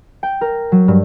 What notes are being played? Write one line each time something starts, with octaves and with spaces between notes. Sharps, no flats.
G5
A#4
F#3
G2